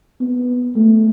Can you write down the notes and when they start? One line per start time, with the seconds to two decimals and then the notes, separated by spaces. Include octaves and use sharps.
0.21 B3
0.76 A3